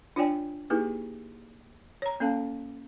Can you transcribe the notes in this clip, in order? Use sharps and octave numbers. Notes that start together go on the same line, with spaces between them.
D4 F4 C#5 D5 G5 G#5
A#3 D#4 E4 G4 G#4 B4
C#5 A#5
A#3 C#4 A4 F5 A5